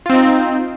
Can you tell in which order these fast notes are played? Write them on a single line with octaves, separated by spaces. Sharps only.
F4 C4 D#4